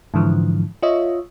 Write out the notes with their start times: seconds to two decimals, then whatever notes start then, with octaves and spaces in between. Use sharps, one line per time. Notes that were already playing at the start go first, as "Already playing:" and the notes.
0.14 G#2 D3 E3 F3
0.82 F4 C#5 D#5 E5